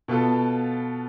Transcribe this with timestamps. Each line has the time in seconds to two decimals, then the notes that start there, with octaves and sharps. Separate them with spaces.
0.08 B2 B3 F4 A4